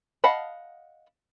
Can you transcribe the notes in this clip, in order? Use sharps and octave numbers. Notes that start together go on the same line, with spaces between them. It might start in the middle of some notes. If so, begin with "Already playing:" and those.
D#5 F5 F#5 A5 B5